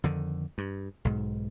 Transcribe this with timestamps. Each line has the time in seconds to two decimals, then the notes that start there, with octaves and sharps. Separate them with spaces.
0.04 F2 D3 D#3
0.58 G2
1.05 B1 G#2